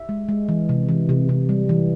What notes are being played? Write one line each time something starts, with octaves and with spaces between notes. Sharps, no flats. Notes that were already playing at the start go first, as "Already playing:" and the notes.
Already playing: E5
G#3
G#3
E3
C3
E3
C3
C3
G3
E3